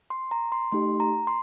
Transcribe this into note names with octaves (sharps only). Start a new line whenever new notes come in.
C6
A#5
C6
A3 D#4 G4 C6
A#5
C6